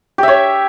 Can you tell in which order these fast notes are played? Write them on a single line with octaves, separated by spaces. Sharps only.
G4 E5 C#5